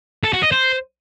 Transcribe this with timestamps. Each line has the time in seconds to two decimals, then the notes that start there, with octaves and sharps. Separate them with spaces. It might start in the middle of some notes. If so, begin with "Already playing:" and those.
0.24 A4
0.33 F#4
0.42 D#5
0.52 C5